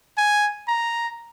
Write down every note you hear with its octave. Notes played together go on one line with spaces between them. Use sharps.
G#5
A#5